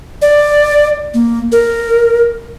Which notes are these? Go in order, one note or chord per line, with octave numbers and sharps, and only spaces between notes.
D5
A#3
A#4